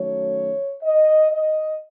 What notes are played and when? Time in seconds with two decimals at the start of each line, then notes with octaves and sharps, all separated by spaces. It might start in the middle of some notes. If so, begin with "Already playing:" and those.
Already playing: F#2 D#3 F#3 A3 C#5
0.83 D#5
1.31 D#5